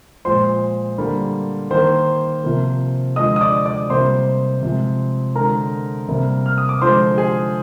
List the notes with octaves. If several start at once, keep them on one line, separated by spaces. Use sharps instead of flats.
A#2 F3 G#3 C5 C6
D3 G3 A#3
D#3 A#3 C5 C6
C3 F3 A#3
D3 F3 G#3 D#5 D#6
D#6
D5 D6
D5 D6
C3 G3 A#3 C5 C6
C3 F3 G#3
D3 G#3 A#4 A#5
C3 G3 A#3
F6
D#6
D6
D3 F3 G#3 C5 C6
G#4 G#5